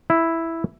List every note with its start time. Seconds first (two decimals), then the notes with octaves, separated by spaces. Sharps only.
0.10 E4